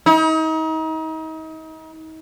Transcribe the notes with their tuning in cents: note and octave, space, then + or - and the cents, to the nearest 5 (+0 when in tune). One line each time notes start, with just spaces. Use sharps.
D#4 +35